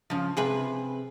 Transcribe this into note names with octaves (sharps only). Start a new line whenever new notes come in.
C#3 F3
C3 G#4 B4